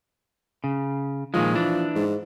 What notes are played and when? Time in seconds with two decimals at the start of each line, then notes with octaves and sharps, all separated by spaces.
0.64 C#3
1.34 A#2 D#3 F3 G#3
1.55 E3 D4
1.96 G#2